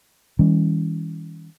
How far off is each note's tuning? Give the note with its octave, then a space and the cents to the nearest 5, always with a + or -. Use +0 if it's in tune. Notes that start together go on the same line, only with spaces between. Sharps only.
E3 -35 G3 +40 C#4 +0